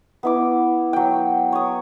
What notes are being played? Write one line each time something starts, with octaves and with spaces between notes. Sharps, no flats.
B3 E4 D6
F#3 G5
C#5 D#6